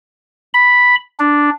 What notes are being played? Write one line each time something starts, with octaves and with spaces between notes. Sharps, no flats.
B5
D4